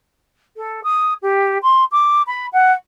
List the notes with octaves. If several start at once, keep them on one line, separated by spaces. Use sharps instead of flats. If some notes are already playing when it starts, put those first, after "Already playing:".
A4
D#6
G4
C6
D6
B5
F#5